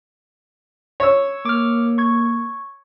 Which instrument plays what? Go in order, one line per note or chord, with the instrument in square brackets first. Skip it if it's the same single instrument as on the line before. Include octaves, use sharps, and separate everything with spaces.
[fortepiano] C#5 E6
[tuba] A#3 [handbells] D6 F6
[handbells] C#6 G#6